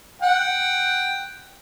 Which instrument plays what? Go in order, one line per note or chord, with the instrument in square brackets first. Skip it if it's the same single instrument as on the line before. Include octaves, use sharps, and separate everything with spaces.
[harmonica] F#5 G5